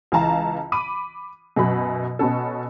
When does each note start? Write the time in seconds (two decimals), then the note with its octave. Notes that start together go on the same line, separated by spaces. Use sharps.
0.12 C#2 E3 F5 A5 A#5
0.72 B5 D6 D#7
1.56 F#2 B2 F#3 B5
2.19 B2 B3 C#4 A4